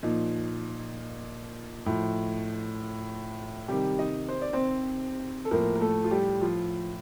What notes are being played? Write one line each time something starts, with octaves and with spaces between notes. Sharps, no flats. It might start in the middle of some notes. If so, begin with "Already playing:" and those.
A#2 F3 D#4
A2 F3
C3 D#3 G3 G4
D#4 D#5
C5
D5
C4 C5
A4
A2 F3 A#3 A#4
A#4
A3 A4
F4
G3 G4
F3 F4